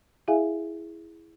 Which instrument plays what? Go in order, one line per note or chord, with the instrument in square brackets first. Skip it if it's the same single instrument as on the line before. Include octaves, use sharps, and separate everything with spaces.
[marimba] E4 G#4 E5 F5 G#5